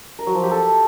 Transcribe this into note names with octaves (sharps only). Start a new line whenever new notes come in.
A#4
F#3
F3
G4
A4